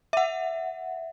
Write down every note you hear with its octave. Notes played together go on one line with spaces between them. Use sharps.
E5 F#5